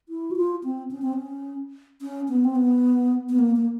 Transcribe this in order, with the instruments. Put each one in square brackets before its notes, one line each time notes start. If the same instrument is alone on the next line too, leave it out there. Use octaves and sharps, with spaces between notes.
[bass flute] E4
F#4
F4
C4
C#4
C4
C#4
C#4
B3
C4
B3
B3
A#3
A#3